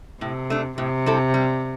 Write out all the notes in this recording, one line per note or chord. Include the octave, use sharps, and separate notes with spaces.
A2 C3
A3 D4
A2 C3
G3 C4 E4 A4
G3